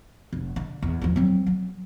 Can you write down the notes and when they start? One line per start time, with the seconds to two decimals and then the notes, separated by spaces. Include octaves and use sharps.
0.33 F1
0.56 D3
0.82 E2
1.01 E2 F3
1.16 F#3 C4
1.46 F#3